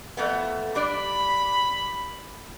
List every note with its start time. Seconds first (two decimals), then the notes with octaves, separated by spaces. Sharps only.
0.17 F2 A3 B3
0.75 G3 D4 D5 B5